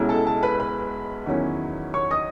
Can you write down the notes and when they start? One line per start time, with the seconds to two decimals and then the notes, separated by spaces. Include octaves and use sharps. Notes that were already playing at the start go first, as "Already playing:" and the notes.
Already playing: B1 B2 G#3 C#4 E4
0.09 A4 A5
0.26 A4 A5
0.43 B4 B5
0.60 B4 B5
1.26 E2 D#3 F#3 C#4 E4
1.94 C#5 C#6
2.11 D#5 D#6